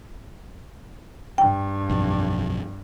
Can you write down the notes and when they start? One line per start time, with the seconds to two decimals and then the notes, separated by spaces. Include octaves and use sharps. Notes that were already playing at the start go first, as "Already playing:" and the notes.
1.38 G2 G5
1.90 B1 F2